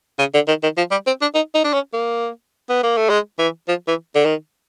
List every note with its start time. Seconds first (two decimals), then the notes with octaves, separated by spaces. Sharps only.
0.19 C#3
0.34 D3
0.48 D#3
0.63 D#3
0.77 F3
0.91 G3
1.07 C4
1.21 D4
1.35 D#4
1.55 D#4
1.64 D4
1.74 C#4
1.93 A#3
2.69 B3
2.83 A#3
2.97 A3
3.10 G#3
3.39 E3
3.68 F3
3.88 E3
4.15 D3
4.25 D#3